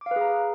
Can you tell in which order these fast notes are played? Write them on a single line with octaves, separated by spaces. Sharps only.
D6 F5 B4 G#4 A#5